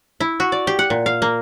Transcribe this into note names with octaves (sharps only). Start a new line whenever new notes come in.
E4
F#4
D5
G4
F#5
A#2
F5
A#3